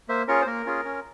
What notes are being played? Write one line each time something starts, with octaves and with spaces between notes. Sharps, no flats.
A#3 C5 E5
C#4 F4 G#4 A#4 C#5
C5
A#3 A#4
C#4 F4 G#4
C#4